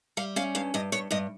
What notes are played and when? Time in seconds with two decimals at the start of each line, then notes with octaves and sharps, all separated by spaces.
0.17 G3 F5
0.36 C#4 F5
0.55 G2 F5
0.74 G2 D#5
0.92 G2 C#5
1.11 G2 D#5